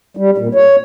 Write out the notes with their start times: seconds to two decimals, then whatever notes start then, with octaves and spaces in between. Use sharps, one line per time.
0.17 G3
0.38 A#2
0.55 C#5